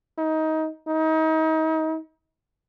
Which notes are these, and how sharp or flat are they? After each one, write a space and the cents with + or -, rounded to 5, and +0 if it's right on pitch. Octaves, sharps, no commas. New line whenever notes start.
D#4 +20
D#4 +35